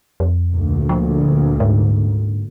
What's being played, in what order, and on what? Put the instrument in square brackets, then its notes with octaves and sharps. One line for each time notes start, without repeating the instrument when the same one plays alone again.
[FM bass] F2
[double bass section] D2 A#2
[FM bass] F3
G#2